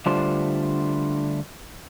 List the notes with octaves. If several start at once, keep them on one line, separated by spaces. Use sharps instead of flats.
D3 G3 A3 D4 F4 C5